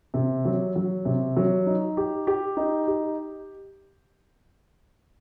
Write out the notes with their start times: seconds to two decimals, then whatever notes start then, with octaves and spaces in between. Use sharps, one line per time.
0.14 C3
0.45 F#3
0.76 F#3
1.05 C3
1.36 F#3
1.66 D#4
1.97 G4
2.27 G4
2.57 D#4
2.87 G4